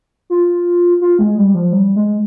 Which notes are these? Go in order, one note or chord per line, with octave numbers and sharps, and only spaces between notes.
F4
F4
G#3
G3
F3
G3
G#3